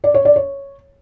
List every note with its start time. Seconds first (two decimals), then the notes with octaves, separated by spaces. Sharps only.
0.04 D5
0.14 C#5
0.25 D5
0.36 C#5